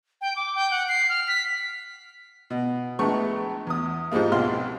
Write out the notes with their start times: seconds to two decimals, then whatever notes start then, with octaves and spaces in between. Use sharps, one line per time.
0.21 G5
0.36 D6
0.55 G5
0.71 F#5
0.89 C7
1.09 F6
1.28 B6
2.50 B2
2.99 A#1 G#3 A3 B3 C#6
3.67 E2 D#6
4.11 G#2 F3 G3 G#3 A#3
4.32 C2 B2 F4 C6 F6